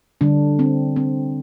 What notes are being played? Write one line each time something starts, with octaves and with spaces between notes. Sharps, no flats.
D3 G3 D4
C4
C4